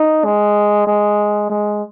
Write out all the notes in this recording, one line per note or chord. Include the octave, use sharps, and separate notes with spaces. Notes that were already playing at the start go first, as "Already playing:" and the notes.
Already playing: D#4
G#3
G#3
G#3